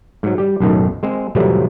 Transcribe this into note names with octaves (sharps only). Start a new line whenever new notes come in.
G#2 F#3
G3 G4
B1 F#2 A2 D#3
G#3 C4
F2 A2 C3 E3 F#3 G3